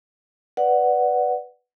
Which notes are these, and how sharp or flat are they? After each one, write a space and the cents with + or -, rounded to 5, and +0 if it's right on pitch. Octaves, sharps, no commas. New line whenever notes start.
B4 +0 D5 +0 F#5 +0